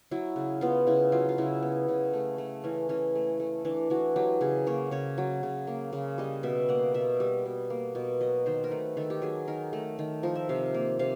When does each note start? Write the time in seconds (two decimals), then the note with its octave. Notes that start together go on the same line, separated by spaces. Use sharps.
0.11 F#3 E4
0.36 C#3
0.61 B3 F4
0.87 C#3 E4
1.12 F#3 F4
1.29 F4
1.38 C#3 E4
1.63 B3
1.88 C#3
2.13 A3
2.38 A3
2.64 E3 C#4
2.89 E3 C#4
3.15 A3
3.40 A3
3.65 E3 D4
3.90 E3 F#4
4.16 F#3 G4
4.41 C#3 G#4
4.67 A#3 C#5
4.91 C#3 C#5
5.18 F#3
5.43 C#3
5.67 A#3
5.93 C#3
6.18 G3 D#5
6.43 B2 E5
6.69 A#3 F#5
6.94 B2 E5
7.20 G3
7.46 B2
7.70 A#3
7.95 B2
8.21 F#3 D#5
8.46 D#3 C5
8.64 A#4
8.71 A3 B4
8.97 D#3 A4
9.10 G4
9.22 F#3 G#4
9.47 D#3 A#4
9.73 A3
9.99 D#3
10.23 F3 A#4
10.35 E5
10.49 C3 F5
10.74 A#3
10.99 C3 F5